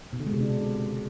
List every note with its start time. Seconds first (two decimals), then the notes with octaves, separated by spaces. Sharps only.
0.13 B2
0.20 D3
0.27 G#3
0.34 C3
0.40 D4